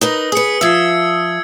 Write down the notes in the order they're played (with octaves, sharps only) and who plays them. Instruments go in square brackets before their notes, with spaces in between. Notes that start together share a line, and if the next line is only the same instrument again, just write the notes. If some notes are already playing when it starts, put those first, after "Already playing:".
[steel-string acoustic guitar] D#4 A#4 B4 [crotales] D#6 G7
[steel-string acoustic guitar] G#4 B4 [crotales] D#6 C#7
[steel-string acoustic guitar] F3 E5 [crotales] E6 G#6 C7